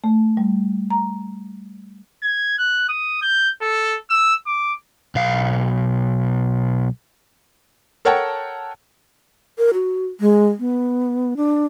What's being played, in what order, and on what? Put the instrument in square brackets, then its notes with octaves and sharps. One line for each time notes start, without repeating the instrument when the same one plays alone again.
[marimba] A3
G3
A#5
[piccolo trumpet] G#6
F#6
D#6
G6
A4
E6
D6
[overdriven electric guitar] B1 F5
[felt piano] A4 A#4 C#5 F#5 G5 A5
[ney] A#4
F#4
G#3
B3
D4